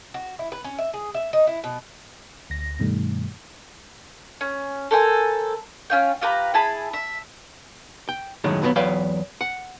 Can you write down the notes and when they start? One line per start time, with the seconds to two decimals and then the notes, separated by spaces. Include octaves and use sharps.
0.14 F#4
0.39 E4
0.52 B4
0.64 C#4
0.78 E5
0.94 G#4
1.14 E5
1.33 D#4
1.47 E4
1.64 B2
2.50 D2 A#6
2.79 G2 B2 D#3 G3 A3
4.41 C#4
4.91 A4 A#4 C5 G#5
5.90 C#4 F4 G5
6.21 F4 G4 B4 A#5
6.54 E4 G#4 A5 B5
6.93 E5
8.09 G5
8.44 F#2 A2 D#3 F#3 G#3
8.62 D#2 B2 F#3 G3 B3
8.76 E2 F#3 B4 F5 G5
9.41 F#5